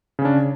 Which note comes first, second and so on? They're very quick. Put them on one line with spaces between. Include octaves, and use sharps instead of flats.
C#3 C#4 D4